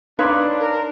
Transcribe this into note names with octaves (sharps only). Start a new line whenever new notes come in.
D4 D#4 B4 C#5 F5 C6 D6
A#4